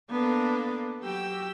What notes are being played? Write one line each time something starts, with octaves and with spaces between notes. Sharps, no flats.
A#3 B3 D4 A4
F#3 F#4 G4 G5 E6